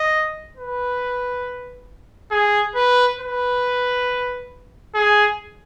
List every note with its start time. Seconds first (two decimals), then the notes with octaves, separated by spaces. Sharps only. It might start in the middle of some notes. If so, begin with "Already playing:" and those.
Already playing: D#5
0.57 B4
2.31 G#4
2.75 B4
3.19 B4
4.95 G#4